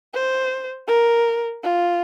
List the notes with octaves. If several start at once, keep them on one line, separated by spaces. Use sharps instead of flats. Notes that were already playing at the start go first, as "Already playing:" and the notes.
C5
A#4
F4